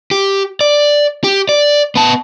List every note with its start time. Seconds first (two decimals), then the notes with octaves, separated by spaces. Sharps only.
0.11 G4
0.61 D5
1.24 G4
1.49 D5
1.95 B3 A5